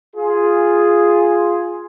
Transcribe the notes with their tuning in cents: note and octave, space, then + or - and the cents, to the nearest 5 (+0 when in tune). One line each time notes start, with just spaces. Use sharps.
F4 +0 G#4 +0